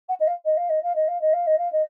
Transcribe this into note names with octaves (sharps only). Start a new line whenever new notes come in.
F#5
D#5
F5
D#5
F5
D#5
F5
D#5
F5
D#5
F5
D#5
F5
D#5